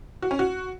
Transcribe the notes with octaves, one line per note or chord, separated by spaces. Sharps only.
F#4
C#4
F#4